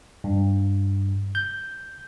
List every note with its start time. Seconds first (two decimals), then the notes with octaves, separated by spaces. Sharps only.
0.24 G2
1.35 G6